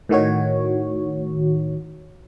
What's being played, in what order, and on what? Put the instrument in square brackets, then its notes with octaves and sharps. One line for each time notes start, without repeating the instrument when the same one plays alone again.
[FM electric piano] A2 D#3 F#4 C#5